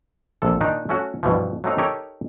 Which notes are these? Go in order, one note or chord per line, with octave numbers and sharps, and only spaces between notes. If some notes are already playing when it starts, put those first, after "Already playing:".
A#1 C3 A4
A#2 D#3 D4 D#4
A3 C#4 F#4
G2 B2 E3 F3
F#3 A3 C4 D#4 F5
D#4 G4 A4 A#4 C#5